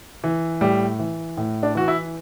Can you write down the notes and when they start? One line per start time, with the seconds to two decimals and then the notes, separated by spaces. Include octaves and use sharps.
0.24 E3
0.61 A2 G3
0.99 E3
1.37 A2
1.63 D4
1.75 E3 F#4
1.88 E4